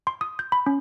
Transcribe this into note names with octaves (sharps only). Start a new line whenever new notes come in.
C6
D#6
G6
B5
C#4